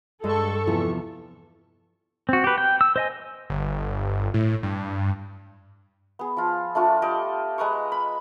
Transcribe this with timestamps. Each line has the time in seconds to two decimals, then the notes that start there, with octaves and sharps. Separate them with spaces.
0.24 G2 G#3 A4 C#6
0.67 E2 C3 F3
2.29 C4 F#4
2.44 G4 B4
2.58 G5
2.81 E6
2.96 C5 D#5 G#5
3.50 G1
4.34 A2
4.63 G2
6.19 B3 G#4
6.37 F3 F4
6.75 A3 D4 F4 C#5
7.02 G4 A4 D5 D#5
7.58 G#3 B4 A#5 C#6
7.92 B5